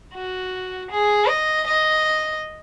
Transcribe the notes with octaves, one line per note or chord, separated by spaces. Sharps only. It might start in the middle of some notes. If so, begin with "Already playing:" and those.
F#4
G#4
D#5
D#5